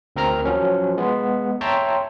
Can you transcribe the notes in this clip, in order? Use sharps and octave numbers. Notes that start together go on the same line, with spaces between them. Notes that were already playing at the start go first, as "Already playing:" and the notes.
D2 C4 A#4 A#5 F6
F3 F#3 C#4
G#3 B3
C#5 E5 G5 A5 A#5 C6